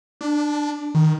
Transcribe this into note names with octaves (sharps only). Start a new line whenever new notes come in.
D4
D#3